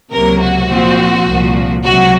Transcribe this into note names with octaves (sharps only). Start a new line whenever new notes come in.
C#2 C3 F#3 A#3 A#4
F#4
A#2 F3 C4
C2 A#2 F3
C#2 C3 F#3 F#4